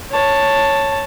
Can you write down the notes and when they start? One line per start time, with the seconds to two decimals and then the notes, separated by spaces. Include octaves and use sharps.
0.11 C#5 A5